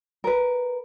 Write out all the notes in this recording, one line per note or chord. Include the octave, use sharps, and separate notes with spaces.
A#4 B4